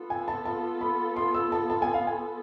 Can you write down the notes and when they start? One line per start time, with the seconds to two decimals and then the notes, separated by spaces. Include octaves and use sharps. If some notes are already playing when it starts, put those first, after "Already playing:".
Already playing: B3 F4 A4
0.10 G#5
0.28 A5
0.45 A5
0.81 B5
1.16 C6
1.34 E6
1.52 A5
1.70 A5
1.82 G#5
1.94 F5
2.07 G#5